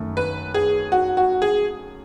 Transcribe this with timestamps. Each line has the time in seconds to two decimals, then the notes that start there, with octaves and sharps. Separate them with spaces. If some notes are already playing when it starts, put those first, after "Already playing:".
Already playing: F#2 D#3 A3
0.17 B4
0.54 G#4
0.92 F#4
1.17 F#4
1.42 G#4